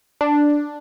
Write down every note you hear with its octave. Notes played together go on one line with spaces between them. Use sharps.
D4